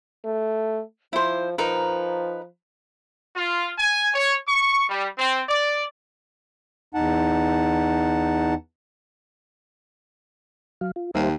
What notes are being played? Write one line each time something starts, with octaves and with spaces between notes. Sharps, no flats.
A3
F3 E4 C5
F3 D#4 A#4 B4
F4
G#5
C#5
C#6
G3
C4
D5
E2 D#4 F#5 A5
F#3 F5
F4
D#2 G3 C5 E5